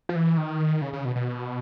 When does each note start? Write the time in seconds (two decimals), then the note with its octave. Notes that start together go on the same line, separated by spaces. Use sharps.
0.09 F3
0.16 E3
0.37 D#3
0.82 C#3
0.93 C#3
1.05 B2
1.16 B2